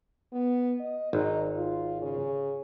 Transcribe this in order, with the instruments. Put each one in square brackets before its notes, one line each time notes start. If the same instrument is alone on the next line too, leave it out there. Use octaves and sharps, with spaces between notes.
[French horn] B3
D#5
[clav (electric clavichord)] G#1 [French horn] D#4
[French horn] F4
C#3